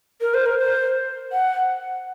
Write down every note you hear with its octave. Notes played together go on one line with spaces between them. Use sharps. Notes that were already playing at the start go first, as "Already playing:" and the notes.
A#4
C5
A#4
C5
F#5